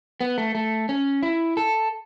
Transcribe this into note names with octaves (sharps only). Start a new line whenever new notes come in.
B3
A3
A3
C#4
E4
A4